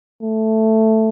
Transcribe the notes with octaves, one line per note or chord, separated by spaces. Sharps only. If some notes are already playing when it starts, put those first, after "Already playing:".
A3